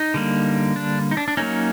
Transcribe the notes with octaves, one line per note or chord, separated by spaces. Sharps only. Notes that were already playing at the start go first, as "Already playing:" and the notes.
Already playing: D#4
D3 G3 A#3
D4
D#4
D4
D4
F#3 A#3 C#4 D#4